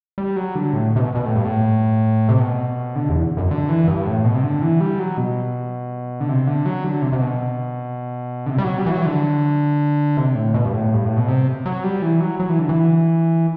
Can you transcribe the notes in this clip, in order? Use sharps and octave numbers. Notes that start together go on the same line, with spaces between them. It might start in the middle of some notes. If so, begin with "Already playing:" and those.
G3
F#3
D3
A2
C3
B2
B2
A2
G2
A2
C3
B2
D3
E2
F#2
D3
E3
G2
A2
B2
C3
D3
E3
G3
F#3
B2
D3
C3
D3
F#3
D3
C3
C3
B2
D3
C3
G3
F#3
G3
E3
F#3
E3
D3
C3
A2
B2
G2
A2
G2
A2
B2
C3
F#3
G3
E3
F#3
F#3
E3
D3
E3